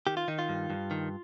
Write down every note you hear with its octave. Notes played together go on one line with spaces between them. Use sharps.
D#3 G4
F4
D#3 D#4
F4
G2
G2
D#3